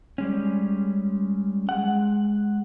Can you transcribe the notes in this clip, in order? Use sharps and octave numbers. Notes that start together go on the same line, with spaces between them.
G3 G#3 C#4
G#3 F#5